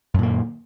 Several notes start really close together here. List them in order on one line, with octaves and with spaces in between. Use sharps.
F#2 A#2 A#3 D#3